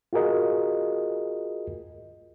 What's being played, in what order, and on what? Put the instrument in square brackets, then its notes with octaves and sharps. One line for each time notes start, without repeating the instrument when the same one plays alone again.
[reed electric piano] F4 F#4 G#4 A#4 D#5